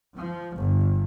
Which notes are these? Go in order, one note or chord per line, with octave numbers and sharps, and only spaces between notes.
F3
G1